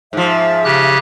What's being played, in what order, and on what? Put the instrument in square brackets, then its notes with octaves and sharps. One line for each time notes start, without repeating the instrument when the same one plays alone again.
[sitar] G#2 F3 [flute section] E5
[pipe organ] C#3 G4 F#6